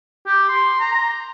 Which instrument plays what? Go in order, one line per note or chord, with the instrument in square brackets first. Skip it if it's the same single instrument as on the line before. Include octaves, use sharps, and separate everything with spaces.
[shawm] G4
C6
A#5